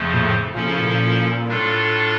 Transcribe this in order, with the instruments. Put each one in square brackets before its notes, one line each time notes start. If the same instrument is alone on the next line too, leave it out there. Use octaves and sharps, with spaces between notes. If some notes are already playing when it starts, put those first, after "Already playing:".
Already playing: [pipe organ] F2 C#3 F3 A3
[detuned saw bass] A#2
A2
[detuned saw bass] A#2 [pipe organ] F3 C#4 E4 A4
[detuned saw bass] C#3
A#2
[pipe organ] A2 G3 D4 F4 A4